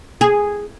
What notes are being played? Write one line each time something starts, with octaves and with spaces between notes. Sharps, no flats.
G#4